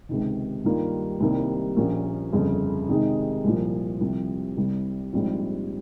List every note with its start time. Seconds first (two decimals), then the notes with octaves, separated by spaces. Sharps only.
0.09 C#2 C3 D#3
0.64 G2 D#3 G3 A#3 F4
1.20 C2 C3 D#3 G3 A#3
1.76 A#1 A#2 F3 A#3 C#4
2.33 G1 F2 C#3
2.89 C3 D#3 G#3 D#4
3.44 C2 A#2 F3
4.00 C2 C3 F3
4.57 C2 C3 G3
5.13 A#1 G#2 G3 C4 F4